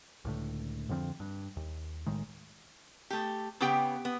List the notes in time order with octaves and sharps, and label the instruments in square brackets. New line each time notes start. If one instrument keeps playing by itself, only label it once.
[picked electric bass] C#2 A2 D3
F2 D3 F3 C4
G2
D#2
B1 A2 D#3 G#3
[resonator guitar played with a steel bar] A3 G4
C#3 B3 G4 G5
B3